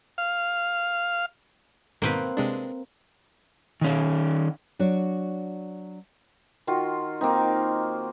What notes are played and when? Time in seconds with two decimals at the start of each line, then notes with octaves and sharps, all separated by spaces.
0.18 F5
2.02 G#2 B2 D#3 A#3 C4 B4
2.37 C3 G#3 D4
3.81 D#3 C#4
4.79 F#3 D4 F#4 C#5
6.67 D#3 F4 F#4
7.21 A#3 C4 D#4